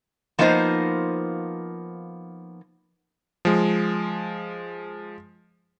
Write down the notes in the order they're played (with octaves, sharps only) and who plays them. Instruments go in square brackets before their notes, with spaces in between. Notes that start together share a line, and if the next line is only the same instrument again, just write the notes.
[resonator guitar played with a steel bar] F3 A#3 B3 D4 D#4 C5
[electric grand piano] F3 G#3